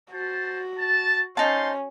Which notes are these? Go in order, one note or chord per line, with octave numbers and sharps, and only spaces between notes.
F#4 C5 A5
A5
C#4 D#4 C5 F5 A5 C6